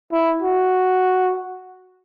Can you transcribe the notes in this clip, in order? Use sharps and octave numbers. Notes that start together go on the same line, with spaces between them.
E4
F#4